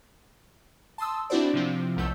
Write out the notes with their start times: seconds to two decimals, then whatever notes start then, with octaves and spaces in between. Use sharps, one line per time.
0.98 A5 C6 D#6 E6
1.30 C4 D4 E4 F#4 C5 D5
1.54 C3 F3 C4
1.96 B1 E2 A3 E6 G6